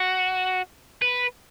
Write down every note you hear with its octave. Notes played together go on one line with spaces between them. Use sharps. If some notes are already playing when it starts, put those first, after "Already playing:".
Already playing: F#4
B4